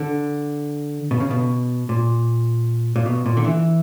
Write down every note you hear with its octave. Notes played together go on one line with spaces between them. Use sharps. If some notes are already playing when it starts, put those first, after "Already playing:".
Already playing: D3
B2
C#3
B2
A#2
A#2
B2
A#2
D3
E3